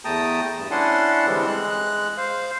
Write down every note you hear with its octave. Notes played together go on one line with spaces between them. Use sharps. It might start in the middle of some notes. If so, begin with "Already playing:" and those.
E2 A3 G5 A5 A#5 D#6
G2
C#4 D4 E4 F#5 A5 C6
D3 E3 G3 G#3 C4
G#3 F#6
C5 F5